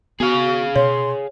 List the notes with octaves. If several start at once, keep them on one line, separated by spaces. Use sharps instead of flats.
B3 F#4 G#4 F5
B2 C#5 C6